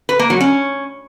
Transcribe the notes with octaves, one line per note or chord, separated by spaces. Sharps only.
B4
A#3
F#3
C#4